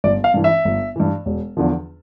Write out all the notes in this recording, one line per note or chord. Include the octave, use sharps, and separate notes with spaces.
G1 D5
F5
G2 E3
E5
G1
G2 E3
E1
E2 D3 F3